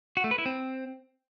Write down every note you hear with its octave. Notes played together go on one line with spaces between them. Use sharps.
F#4
A3
B4
E4
C4